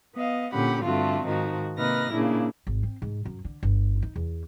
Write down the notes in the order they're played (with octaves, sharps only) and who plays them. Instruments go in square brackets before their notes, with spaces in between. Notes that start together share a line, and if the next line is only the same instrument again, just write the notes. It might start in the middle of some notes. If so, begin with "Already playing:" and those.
[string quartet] B3 D#5 F5
A#2 D3 C#4 G4 F#5 B5
G2 D3 A3 C4 F4 F#4
G#2 D#3 F3 D#4 F#4
C3 A#3 D#4 B4 F6 A#6
A#2 C#3 A#3 D4 E4
[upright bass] G#1
C4
G#2
F#2
D3
G1
D#4
E2